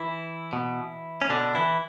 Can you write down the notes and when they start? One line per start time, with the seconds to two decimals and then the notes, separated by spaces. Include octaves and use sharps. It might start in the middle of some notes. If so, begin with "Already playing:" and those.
Already playing: E3 E4
0.53 B2
1.22 C#4
1.30 B2 D3 D4
1.55 E3 E4